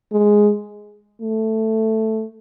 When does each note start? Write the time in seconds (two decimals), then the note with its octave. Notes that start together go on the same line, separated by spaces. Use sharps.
0.12 G#3
1.21 A3